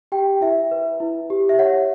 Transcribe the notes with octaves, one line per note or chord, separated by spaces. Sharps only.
G4 G5
E4 E5
B4
E4
G4
E5
C#5 F#5